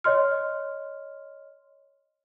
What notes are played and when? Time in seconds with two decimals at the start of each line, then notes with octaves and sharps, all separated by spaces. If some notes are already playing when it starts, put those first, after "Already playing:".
0.04 C#5 D#5 C6 F6